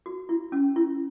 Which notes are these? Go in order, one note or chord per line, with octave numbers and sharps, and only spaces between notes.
F#4
E4
C#4
E4